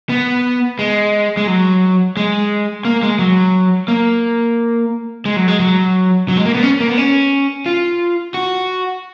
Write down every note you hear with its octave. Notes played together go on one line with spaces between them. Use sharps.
B3
G#3
G#3
F#3
G#3
A#3
G#3
F#3
A#3
G#3
F#3
G#3
F#3
F#3
G#3
A#3
B3
C#4
A#3
B3
C#4
F4
F#4